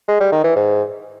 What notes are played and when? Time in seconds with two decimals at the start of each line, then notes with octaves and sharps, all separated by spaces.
0.09 G#3
0.20 G3
0.32 D#3
0.44 E3
0.56 G#2